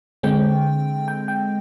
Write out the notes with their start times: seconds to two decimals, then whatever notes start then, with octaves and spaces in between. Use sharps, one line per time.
0.23 D3 G#3 C4 G5
1.08 G5
1.28 G5